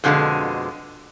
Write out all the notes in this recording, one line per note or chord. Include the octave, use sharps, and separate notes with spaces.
F2 B2 D3 F#3 G#3